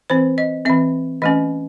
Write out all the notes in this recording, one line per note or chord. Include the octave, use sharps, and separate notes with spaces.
E3 C4 C5
D#5
E3 C4 E5
E3 A3 C#4 D#5